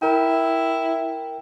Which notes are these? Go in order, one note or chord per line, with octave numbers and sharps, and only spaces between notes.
E4 A#4 G5